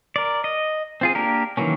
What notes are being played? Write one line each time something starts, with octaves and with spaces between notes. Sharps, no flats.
A#4 D5
D#5
C4 F4 G#4
A#3 D4 G4 A#4
D#3 E3 F#3 A#3 C#4